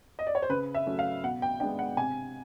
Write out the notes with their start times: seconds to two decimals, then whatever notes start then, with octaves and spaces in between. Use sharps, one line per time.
0.19 D#5
0.27 D5
0.35 C#5
0.42 C5
0.49 C#3 B4
0.75 E5
0.87 F#3 A3 C#4
0.99 F5
1.23 B2 F#5
1.42 G5
1.60 G#3 B3 D4 G5
1.79 F#5
1.97 C3 G#5